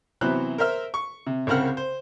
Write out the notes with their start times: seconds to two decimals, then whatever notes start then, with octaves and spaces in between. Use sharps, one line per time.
0.21 C3 E3 F#3 B3 C5 F#6
0.58 A#4 C5 E5 F6
0.94 C#6
1.27 C3
1.47 C2 C#3 C4 A#4 F#5 F6
1.77 C5